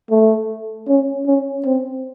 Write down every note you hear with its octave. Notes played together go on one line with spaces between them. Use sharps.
A3
C#4
C#4
C4